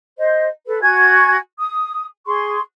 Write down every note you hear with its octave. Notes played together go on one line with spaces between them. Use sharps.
C5 D#5
A4 B4
F#4 G#5 G#6
D#6
G#4 C6 C#6